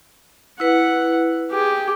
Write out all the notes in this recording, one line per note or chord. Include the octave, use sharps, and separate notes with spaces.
E4 B4 F#5
G4 G#4